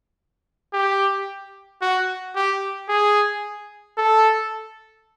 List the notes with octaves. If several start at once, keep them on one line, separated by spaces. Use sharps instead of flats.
G4
F#4
G4
G#4
A4